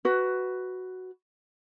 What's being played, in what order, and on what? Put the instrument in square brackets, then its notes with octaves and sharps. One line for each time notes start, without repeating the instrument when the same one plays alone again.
[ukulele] F#4 B4